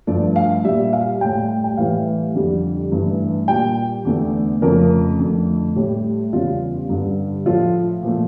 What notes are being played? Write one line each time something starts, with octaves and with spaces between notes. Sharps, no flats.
G2 F3 A3 D5
F5
A#2 G3 E5
F5
A2 G3 G5
G5
A2 E3 G3 F5
F2 D3 G3
G2 E3 A3
A#2 G3 G5
E2 D3 A3
F2 C#3 F3 A3 A#4
F2 D3 A3
A2 G3 G4
E2 C#3 G3 F4
G2 D3 G3
A2 F3 A3 F4
A#2 F3 A3